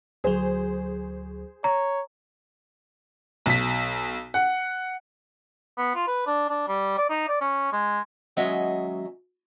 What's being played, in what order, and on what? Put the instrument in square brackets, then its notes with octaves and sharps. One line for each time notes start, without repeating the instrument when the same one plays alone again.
[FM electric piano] D2 F#3 [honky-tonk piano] G#4 C5
[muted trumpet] C#5 [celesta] A#5
[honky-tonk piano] B1 B6
F#5
[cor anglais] B3
F4
B4
D4
D4
G3
D5
D#4
D5
C#4
G#3
[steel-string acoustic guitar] D#2 F#3 G#3 C#4 D#5 E5